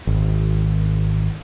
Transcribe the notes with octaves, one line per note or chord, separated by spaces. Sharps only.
G#1